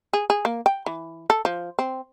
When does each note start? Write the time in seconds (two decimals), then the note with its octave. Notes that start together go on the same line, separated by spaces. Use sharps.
0.13 G#4
0.30 G#4
0.45 A#3
0.66 G5
0.86 E3
1.30 A4
1.45 F3
1.79 C4